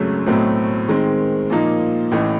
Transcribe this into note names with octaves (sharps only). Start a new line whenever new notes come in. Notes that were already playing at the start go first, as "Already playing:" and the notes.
Already playing: G#1 F#2 C#3 F#3 A3
B1 A2 F#3 A3 C4
D#3 G#3 C4
A#2 F3 A#3 D#4
A1 A2 E3